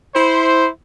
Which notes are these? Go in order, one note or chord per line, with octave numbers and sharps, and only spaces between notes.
E4 C5